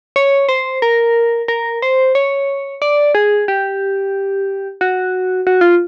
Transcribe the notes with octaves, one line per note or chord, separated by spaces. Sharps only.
C#5
C5
A#4
A#4
C5
C#5
D5
G#4
G4
F#4
F#4
F4